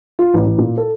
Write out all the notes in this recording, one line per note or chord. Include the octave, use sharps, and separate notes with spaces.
F4
A1
A1
A#2
A4